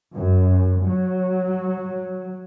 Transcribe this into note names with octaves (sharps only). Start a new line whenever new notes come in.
F#2
F#3